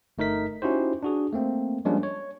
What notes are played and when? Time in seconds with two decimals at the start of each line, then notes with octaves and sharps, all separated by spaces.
0.18 G1 A3 D#4 A#4 B6
0.62 C#4 D#4 E4 F#4 G4 C5
1.03 D4 F#4 G#4
1.33 A3 A#3 C4
1.85 F3 G3 G#3 A#3 C#4 D4
2.03 C#5